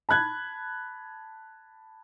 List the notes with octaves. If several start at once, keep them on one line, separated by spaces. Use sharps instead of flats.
A5 B5 F#6 G#6